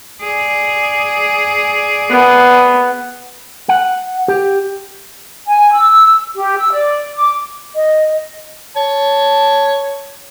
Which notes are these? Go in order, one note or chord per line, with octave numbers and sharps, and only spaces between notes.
G#4 D5
B3
F#5
G4
G#5
E6
G4
E6
D5
D6
D#5
C#5 A5